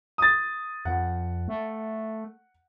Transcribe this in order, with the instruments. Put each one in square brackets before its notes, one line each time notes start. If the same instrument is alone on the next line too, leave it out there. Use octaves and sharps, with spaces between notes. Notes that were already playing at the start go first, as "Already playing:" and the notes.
[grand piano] D#6 A6
[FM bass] F2 [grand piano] F#5
[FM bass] A3